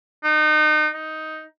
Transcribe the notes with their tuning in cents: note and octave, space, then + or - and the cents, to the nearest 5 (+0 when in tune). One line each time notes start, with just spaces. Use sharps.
D#4 -30
D#4 +10